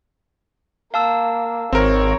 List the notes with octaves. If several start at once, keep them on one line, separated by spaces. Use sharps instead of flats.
A#3 F5 A5 E6
G#1 C4 A#4 C#5 A#5